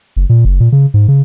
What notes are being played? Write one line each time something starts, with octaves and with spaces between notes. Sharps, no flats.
F#1
A#2
F#1
A#2
C#3
G#2
C#3